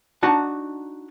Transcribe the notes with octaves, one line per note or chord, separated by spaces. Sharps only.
D4 D#4 F#4 F#5 A5